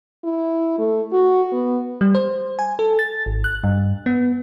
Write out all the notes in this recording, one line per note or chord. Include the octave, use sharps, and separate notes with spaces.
E4
A3
F#4
B3
G3
C5
G#5
A4
A6
G#1
F#6
G2
B3